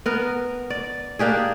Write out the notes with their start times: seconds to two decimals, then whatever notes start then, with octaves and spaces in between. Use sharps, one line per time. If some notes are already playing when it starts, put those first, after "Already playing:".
0.06 B3 A#4
0.70 D5
1.19 A#3 D4 G4 G#4